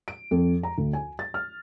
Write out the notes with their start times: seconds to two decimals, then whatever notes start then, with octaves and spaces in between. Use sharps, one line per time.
0.08 D7
0.31 F2
0.63 A#5
0.78 D2
0.93 G#5
1.19 A6
1.34 F6